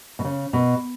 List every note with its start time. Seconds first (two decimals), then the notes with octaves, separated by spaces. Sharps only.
0.19 B2
0.25 C#3
0.53 B2